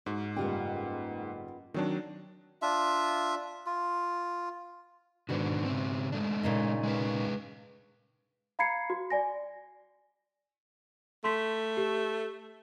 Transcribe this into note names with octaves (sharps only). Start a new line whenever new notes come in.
G#2 F#4
F#1 G3 B3 F4 G5
D#3 F#3 C4 D4 C#5
D4 F4 E5
F4
G#2 B2 D3 D#3 D4 F#4
C#3 C4
G#3 A3 D4
A#2 C#3 D#4
G#3 G#4 B4
F5 A#5 B5 G#6 C7 C#7
F#4
D5 G#5 A#6
A3 C6 B6
G4